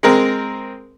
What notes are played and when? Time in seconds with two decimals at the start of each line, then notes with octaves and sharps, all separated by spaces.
0.03 G#3 C4 A#4